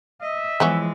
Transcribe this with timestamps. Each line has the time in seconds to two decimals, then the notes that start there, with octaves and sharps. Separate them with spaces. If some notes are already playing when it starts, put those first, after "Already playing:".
0.22 D#5 E5
0.60 E3 F3 G#3 B3 E4 C#5